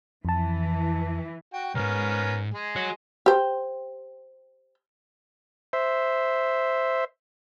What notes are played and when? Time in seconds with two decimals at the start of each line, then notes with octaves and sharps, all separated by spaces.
0.25 F2 E3 A5
1.53 F#4 G5
1.75 C2 G#2 B3 C#4 A#4
2.54 G#3 G#4
2.76 F#4 C#5
3.26 G4 C5
5.73 C5 E5